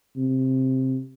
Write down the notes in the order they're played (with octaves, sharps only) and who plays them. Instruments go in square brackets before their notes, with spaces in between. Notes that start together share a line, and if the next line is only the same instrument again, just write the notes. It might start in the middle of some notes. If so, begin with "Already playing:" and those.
[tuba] C3